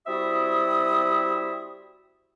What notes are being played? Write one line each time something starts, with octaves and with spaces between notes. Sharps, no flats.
G3 C4 E4 F#4 E5 D#6